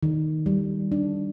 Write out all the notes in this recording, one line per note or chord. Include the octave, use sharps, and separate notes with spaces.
D#3
G3
D4